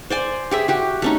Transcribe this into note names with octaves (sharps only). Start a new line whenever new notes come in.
C5 D5 G#5
G4 G#4 E5
F#4 G4
A3 C#4 D#4